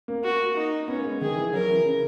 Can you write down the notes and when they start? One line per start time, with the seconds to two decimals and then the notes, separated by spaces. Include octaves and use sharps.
0.08 A#3
0.23 F#4
0.56 D#4
0.88 B3 C#4
0.97 A#3
1.05 G#3
1.21 D#3 G#4
1.36 E3
1.53 F#3 A#4
1.70 E3
1.85 C#3